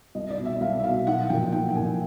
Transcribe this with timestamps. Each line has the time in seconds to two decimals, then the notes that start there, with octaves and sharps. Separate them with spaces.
0.15 C2 D#5
0.31 D5
0.38 B2
0.45 E5
0.61 C2 F5
0.80 E5
0.84 B2 F5
1.07 B1 F#5
1.30 A#2 F3 G5
1.52 B1 G5
1.69 G5
1.76 A#2 F3 G#5